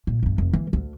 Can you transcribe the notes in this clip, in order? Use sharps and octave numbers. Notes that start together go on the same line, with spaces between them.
A#2
E2 G2
F1
E3 A#3
D2 D3